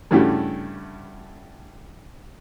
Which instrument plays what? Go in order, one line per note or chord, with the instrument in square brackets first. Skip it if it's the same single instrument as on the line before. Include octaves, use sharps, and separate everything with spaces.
[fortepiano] G2 C#3 A3 E4 F#4 G4